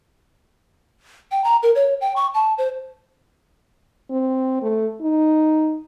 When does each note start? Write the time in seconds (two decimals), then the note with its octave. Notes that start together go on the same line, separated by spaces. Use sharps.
1.31 G5
1.44 A#5
1.63 A#4
1.75 C#5
2.01 G5
2.16 C#6
2.34 A5
2.58 C5
4.11 C4
4.62 A3
5.01 D#4